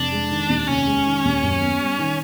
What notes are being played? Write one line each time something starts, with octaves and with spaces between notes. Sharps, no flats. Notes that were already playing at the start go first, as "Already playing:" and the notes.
Already playing: F1 D4
G#3
D#3
D#2
F1 C#4
G#3
D#3
D#2
F#2
B3
G3
D#3